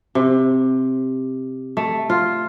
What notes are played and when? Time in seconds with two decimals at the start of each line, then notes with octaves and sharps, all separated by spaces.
0.15 C3
1.77 A3
2.10 F4